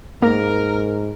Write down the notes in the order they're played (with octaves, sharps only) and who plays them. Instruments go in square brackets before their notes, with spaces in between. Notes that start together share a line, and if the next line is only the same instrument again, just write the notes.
[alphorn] G#2 [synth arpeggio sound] A#3 [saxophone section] A#4